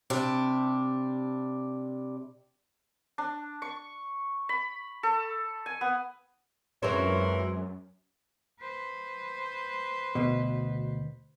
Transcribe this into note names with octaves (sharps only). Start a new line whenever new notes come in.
C3 G3 D4
D4
C#6
B5
A4
G#5
B3
F#2 A#2 E3 F#3 G#3 C4 A#4 C#5
B4 C5
D2 B2